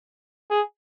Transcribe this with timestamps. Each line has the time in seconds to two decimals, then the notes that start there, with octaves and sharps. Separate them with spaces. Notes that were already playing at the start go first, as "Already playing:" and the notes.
0.50 G#4